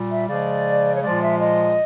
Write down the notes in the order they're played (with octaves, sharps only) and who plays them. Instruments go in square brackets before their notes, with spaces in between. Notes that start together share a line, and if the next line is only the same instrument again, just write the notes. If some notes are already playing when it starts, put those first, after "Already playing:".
Already playing: [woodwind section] A#2 G3
E5
C#3 F3 G#3 D5
C#5
A#2 F3 G#3 D5
E5
D#5